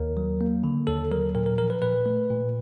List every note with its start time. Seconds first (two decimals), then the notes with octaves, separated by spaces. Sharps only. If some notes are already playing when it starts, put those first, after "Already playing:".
Already playing: D#2 A#4
0.17 F#3
0.41 A#3
0.64 D3
0.87 D#2 A4
1.11 F#3 A#4
1.35 A#2 A#4
1.46 A#4
1.58 F3 A#4
1.70 B4
1.82 A#2 B4
2.06 A3
2.30 A#2